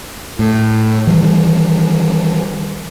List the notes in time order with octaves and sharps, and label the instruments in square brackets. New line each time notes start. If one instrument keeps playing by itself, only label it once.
[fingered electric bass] A2
D#3 E3 G3